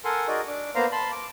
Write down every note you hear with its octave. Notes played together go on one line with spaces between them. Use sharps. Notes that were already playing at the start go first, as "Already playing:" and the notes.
A4 A#4 F#5 G#5 C6
D#4 F#4 G#4 A#4 D5 D#5
D4 D6
A#3 B3 C5 F5 A#5
A5 B5 C6
D6